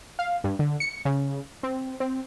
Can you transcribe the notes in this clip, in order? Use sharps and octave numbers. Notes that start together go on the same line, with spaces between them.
F5
G2
D3
C#7
C#3
C4
C4